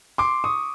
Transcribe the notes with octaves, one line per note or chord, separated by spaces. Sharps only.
C6 D6
C#6 D#6